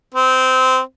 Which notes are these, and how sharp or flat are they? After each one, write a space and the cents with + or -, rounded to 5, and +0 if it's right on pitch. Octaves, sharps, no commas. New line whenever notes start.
C4 -15